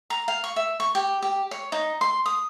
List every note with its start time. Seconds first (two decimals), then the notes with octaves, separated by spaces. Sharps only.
0.10 A#5
0.28 F5
0.44 C#6
0.56 E5
0.80 C#6
0.95 G4
1.22 G4
1.51 C#5
1.72 D#4
2.01 C6
2.26 D#6